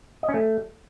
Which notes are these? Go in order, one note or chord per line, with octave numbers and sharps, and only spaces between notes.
D#5
C#4
A3